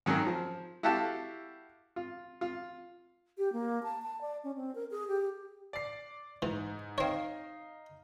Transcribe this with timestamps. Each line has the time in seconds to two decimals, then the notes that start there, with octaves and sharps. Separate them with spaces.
0.06 D#3 F#3 C#4 G#4 A#4
0.27 F3
0.83 E4 F#4 G4 A4 F5 A5
1.96 F4
2.41 F4
3.38 G4
3.53 A#3
3.83 A5
4.02 A5
4.21 D5
4.44 C#4
4.56 C4
4.75 A#4
4.91 G#4
5.08 G4
5.73 D5 C7
6.42 G#2 E3
6.98 C4 D#4 C#5 F5